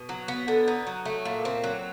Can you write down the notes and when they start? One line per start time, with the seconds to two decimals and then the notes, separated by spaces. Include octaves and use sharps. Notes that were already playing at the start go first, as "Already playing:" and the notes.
Already playing: B2
0.09 F#3
0.28 B3
0.48 D3
0.68 D#4
0.87 F#3
1.05 A3
1.25 A#2
1.45 C4
1.64 F#3